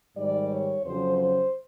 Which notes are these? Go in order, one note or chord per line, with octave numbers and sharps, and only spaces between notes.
G#2 D#3 G3 D5
C#5
F2 C#3 F#3 C5
C5